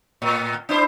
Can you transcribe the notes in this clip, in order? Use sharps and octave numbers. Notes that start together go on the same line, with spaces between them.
A2
D4 E4 C5